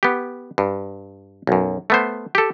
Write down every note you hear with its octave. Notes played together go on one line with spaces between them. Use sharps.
B3 G4
G2
B1 F#2
A3 B3 C5
G4 A4